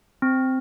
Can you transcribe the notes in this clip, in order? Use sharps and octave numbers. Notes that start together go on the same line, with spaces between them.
C4